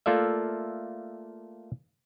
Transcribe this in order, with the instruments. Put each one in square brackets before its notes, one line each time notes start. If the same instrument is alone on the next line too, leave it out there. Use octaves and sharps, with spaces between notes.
[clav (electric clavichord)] A3 A#3 F4 A4 D5 E5